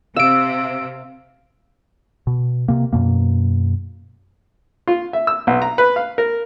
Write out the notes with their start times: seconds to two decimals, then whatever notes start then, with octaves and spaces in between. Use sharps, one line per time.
0.16 C3 F5 E6 D7
2.27 B2
2.68 C3 A#3
2.93 F#2 B2 A#3
4.87 F4
5.13 E5
5.27 E6
5.47 B1
5.62 A#5
5.78 B4
5.96 F5
6.18 A#4